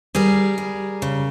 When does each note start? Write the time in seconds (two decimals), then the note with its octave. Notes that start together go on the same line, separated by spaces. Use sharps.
0.15 G3 G#4 A#4
0.58 G3
1.02 C#3